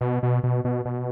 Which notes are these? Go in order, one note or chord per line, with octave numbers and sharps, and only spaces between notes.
B2
B2
B2
B2
B2